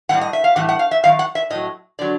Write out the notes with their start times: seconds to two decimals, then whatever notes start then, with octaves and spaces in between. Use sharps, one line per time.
0.09 A2 E3 F#5
0.14 G3
0.21 D#5
0.33 E5
0.44 F5
0.56 A2 E3 G3 F#5
0.69 F#5
0.79 F5
0.91 E5
1.03 F#2 D#3 F5
1.19 F#5
1.35 E5
1.50 A2 F#3 D#5
1.99 D3 F#3 D5